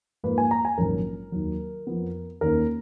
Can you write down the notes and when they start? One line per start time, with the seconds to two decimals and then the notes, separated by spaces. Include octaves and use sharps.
0.23 G#2 F3 A#3 B4
0.38 G#5
0.51 A#5
0.65 G#5
0.78 A#1 G#2 D#3 F#3 C#4 A#4
1.32 D#2 D#3 F#3
1.87 F2 F3 B3
2.41 D#2 D#3 A#3 C#4 A#4